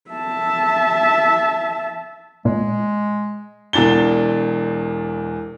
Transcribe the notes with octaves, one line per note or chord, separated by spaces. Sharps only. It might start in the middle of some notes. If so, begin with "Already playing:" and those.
E5 A5
A#2 G#3
E1 E2 D4 A6 G7